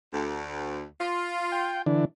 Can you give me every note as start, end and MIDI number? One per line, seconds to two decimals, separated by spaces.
0.14 0.86 38
1.01 1.78 65
1.52 1.82 79
1.86 2.05 50
1.86 2.05 52
1.86 2.05 62